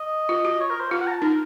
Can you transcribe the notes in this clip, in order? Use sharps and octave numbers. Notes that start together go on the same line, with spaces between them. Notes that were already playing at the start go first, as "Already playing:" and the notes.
Already playing: D#5
F4
F#4
C#5
A#4
C5
F4 F5
F#5
A#5
A5
D#4 A#4